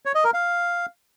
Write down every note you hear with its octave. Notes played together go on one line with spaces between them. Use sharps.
C#5
D#5
A#4
F5